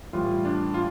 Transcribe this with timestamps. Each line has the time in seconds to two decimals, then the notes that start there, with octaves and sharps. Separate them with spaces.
0.13 A2 E3 G3 F4
0.45 D4
0.74 F4